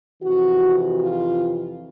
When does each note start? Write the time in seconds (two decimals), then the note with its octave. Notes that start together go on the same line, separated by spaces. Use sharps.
0.22 F2 C3 E3 F#4
0.99 F4